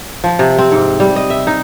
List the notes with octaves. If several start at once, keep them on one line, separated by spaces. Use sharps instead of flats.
F3
C3
C4
G#2
G3
D#5
E5
D#4